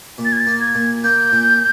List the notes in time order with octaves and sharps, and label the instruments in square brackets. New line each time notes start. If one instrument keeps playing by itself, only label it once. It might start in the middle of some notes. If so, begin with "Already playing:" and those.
[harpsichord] A#2
[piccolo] A6
G#6
A6
[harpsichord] A#3
[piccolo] G#6
[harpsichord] A#2
[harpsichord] A#3 [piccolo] G6
[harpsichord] A#2